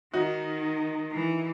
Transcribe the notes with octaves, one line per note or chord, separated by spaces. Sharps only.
D#3 D#4 F#4
E3